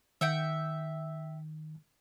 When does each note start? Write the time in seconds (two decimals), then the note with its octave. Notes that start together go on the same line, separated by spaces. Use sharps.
0.21 D#3 E5 F#5 G5